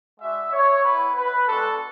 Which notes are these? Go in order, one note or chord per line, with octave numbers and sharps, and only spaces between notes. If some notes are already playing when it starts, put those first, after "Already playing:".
G#3 D4 F#4 E5
C#5
B3 E4 B4
B4
G#3 B3 D4 F#4 A4